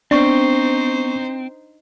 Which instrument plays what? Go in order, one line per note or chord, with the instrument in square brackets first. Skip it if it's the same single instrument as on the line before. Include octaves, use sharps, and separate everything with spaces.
[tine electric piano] B3 C#6 [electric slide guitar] C4 [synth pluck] D4 [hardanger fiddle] D#4 C5